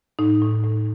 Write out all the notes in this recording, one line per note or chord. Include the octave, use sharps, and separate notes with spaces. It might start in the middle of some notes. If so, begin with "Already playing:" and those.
A2 D#4
A2
A2